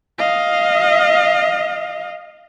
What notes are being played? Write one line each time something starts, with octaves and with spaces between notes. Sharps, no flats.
D#5 F5